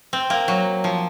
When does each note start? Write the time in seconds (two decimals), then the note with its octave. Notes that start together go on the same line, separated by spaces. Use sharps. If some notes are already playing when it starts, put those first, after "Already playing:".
0.13 C4
0.30 A#3
0.48 F#3
0.84 F3